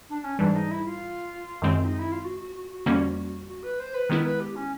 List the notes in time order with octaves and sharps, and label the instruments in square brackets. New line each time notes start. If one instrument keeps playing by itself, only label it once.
[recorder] D4
C#4
[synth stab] G#2 E3 G3 [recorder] D4
[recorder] D#4
E4
F4
[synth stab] F#2 D#3 G#3 C4
[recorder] D#4
E4
F4
F#4
F#4
F#4
F#4
[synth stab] F2 D3 G3 A#3 C#4
[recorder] F#4
B4
C5
B4
[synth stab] D#3 G#3 B3 E4 [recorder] A#4
[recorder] B4
G4
C#4